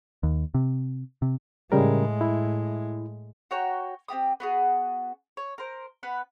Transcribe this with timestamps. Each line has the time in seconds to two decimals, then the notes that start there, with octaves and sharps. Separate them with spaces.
0.23 D#2
0.54 C3
1.22 C3
1.72 A2 C#3 G3 G#3 A#4
2.21 E4
3.51 F#4 C#5 G5 A#5
4.08 C4 F4 G4 D#6
4.40 B3 F#4 G#4
5.37 C#5
5.58 A#4 C5
6.03 B3 B4 F#5